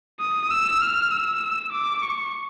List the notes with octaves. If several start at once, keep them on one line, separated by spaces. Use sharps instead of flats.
D#6
E6
F6
E6
D6
C#6